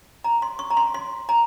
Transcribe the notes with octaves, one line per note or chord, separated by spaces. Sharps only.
A#5
C6
C#6
A#5
C6
C6
A#5